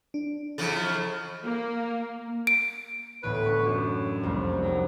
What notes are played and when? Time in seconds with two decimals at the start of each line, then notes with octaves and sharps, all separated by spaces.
0.14 D4
0.58 F2 C#3 E3 A4 A6
1.44 A#3
2.47 D7
3.23 A1 D2 A2 B3 B4
3.45 D4 C#6
3.66 F#2
4.23 C2 F2 A#3
4.62 D#3 F#3